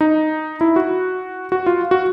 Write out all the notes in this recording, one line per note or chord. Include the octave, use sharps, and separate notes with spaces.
D#4
E4
F#4
F#4
F4
F#4